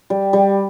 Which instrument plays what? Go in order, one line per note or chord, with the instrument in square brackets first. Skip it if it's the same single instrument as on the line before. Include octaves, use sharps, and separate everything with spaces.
[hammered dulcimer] G3
G3